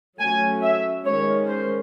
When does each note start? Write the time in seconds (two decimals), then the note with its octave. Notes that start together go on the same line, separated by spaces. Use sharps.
0.20 F#3 A3 C#4 G#5
0.63 E5
1.05 D#3 G#3 C#4 C#5
1.48 C5